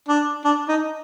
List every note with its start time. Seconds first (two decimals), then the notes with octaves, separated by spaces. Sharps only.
0.09 D4
0.45 D4
0.68 D#4